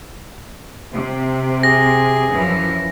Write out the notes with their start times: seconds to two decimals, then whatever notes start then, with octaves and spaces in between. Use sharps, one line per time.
0.93 C3
1.63 G#4 A#6
2.32 F#2 E3 F3